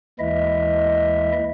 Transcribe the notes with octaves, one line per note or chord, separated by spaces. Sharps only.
D#2 E3 G#3 E4 D#5 E5